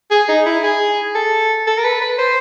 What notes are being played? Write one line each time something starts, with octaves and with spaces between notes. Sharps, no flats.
G#4
D#4
E4
G#4
A4
A4
A#4
B4
B4
C5